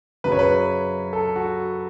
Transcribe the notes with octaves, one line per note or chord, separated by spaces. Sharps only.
F#2 C#3 F#3 B4
C#5
B4
A4
F#4